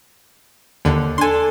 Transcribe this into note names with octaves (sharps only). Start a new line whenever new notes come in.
D#2 D3
D4 A4 G#5 C6